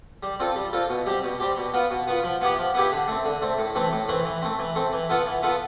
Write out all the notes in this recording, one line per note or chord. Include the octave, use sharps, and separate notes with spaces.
G3
C4 F4 A4
G3
C4 F4 A4
B2
G3 C4 G4
B2
G3 C4 G4
B2
B3 F4
B2
B3 F4
F3
B3 E4 G4
F3
B3 E4 G4
D3
A3 C4
D3
A3 C4
A2
E3 A3 C4
A2
E3 A3 C4
E3
A3 C4
E3
A3 C4
E3
B3 F4 A4
E3
B3 F4 A4